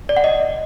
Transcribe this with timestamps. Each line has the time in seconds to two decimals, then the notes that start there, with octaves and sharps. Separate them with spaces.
0.09 D5
0.17 F#5
0.24 D#5